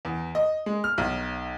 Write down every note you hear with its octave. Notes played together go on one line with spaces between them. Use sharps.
E2
D#5
G#3
F6
B1